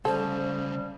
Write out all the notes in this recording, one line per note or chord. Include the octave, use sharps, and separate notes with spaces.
D2 C#3 G3 A4 C5